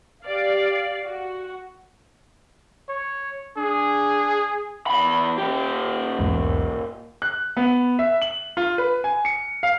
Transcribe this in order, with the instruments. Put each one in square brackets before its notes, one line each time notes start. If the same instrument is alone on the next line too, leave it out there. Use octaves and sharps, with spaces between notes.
[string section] G4 D5 F5
F#4
[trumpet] C#5
[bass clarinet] D4 [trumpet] G#4
[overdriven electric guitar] E2 B5
A#2 G4
[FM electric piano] B1 E2 G#2
[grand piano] F#6
B3
E5
F#7
F4
B4
G#5
C#7
F5